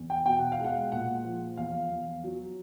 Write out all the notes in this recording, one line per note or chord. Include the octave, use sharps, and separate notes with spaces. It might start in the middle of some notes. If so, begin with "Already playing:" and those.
Already playing: E2
G5
B2 G5
F#5
F5
G#3
F#5
A#2 F#5
F3
E2 F5
E2
F#3